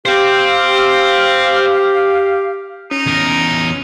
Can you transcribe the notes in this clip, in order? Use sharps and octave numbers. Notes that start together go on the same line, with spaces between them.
G4 C5 F5 G5
C#4 D#4
E2 A#4